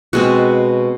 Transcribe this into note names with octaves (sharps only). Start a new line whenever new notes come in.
B2 G#3 C4 F#4